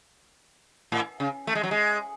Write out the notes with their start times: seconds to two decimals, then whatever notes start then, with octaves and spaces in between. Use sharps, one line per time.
0.92 A2
1.20 C#3
1.47 A3
1.55 G#3
1.63 F#3
1.71 G#3